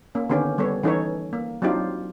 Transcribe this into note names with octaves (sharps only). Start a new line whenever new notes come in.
A#3 C#4
D3 D#3 B3 C#4 G4
G3 B3 A4 C#5
E3 C#4 D#4 A4 B4 C#5
A#3
F#3 C4 D4 D#4 F4 G4